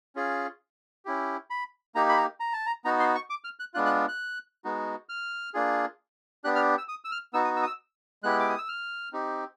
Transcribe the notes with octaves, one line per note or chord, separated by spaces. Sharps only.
C#4 F4 G#4
C#4 E4 G4
B5
A#3 D#4 G4 A#5
B5
A#5
A#5
A5
A#5
B3 D#4 F#4 A#5
C6
C#6
D6
F6
F#6
G#3 B3 D4 F4 F#6
F#6
F#6
G#3 B3 D#4 F#4
F6
A#3 D4 F4 G#4
B3 D4 G4 F#6
F6
E6
D#6
E6
F6
B3 D#4 F#4 E6
D#6
E6
D#6
E6
G#3 B3 E4 G4 F#6
D6
D#6
E6
F6
C4 D#4 G4